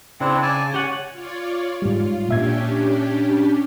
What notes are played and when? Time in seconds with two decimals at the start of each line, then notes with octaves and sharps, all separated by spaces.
0.20 C#3 C4 D4 E4
0.42 D5 G#5 A5
0.74 G4 C#5 F#5 G#5
1.11 F4 C#5 D5
1.82 G#2 G3 F4
2.29 A#2 C#4 D4 G4 E5 G#6